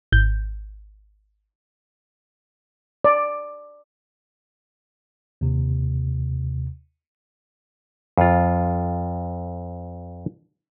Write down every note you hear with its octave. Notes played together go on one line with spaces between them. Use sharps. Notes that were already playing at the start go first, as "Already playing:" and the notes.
G#1 G6
D5
D#2 C3
F2 F4